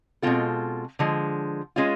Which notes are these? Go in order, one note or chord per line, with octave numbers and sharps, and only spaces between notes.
B2 G#3 C4 F4 A4
D3 F3 G#3
G#3 C#4 F4